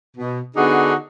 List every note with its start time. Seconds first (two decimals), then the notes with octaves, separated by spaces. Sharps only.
0.17 B2
0.57 D3 B3 D4 D#4 F#4 G#4